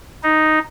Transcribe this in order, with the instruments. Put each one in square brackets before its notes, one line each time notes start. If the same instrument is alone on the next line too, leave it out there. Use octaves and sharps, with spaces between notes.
[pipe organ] D#4